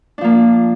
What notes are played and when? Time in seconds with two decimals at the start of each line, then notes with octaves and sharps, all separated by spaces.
0.18 D4
0.21 F3
0.24 A#3